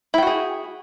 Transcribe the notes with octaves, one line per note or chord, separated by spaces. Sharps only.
E4 F#4 G#4 G5